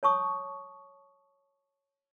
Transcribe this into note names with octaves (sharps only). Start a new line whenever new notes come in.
C#5 A5 C#6 D#6